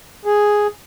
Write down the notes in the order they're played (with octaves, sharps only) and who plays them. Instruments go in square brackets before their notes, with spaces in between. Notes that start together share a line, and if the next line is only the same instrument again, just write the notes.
[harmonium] G#4